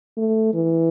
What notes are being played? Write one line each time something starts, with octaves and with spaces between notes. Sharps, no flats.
A3
E3